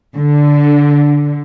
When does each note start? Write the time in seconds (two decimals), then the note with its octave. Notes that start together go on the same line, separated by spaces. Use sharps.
0.15 D3